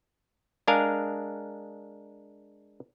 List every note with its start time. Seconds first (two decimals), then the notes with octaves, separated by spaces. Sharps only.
0.67 G#3 D4 G#4 A#4 F5